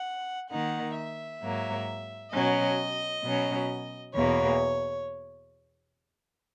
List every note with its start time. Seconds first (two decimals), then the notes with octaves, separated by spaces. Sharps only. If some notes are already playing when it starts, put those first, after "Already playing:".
Already playing: F#5
0.51 D#3 A#3 D#4 F#5
0.96 E5
1.42 G#2 F#3 A#3
2.33 B2 F#3 C#4 D#5
3.23 B2 F#3 C#4
4.15 E2 B2 A#3 C#5